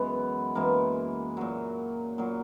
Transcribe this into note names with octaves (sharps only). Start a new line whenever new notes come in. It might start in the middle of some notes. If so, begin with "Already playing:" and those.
Already playing: F#2 E3 G#3 B3
F#2 E3 G#3 A#3
A#2 F#3
A#2 F#3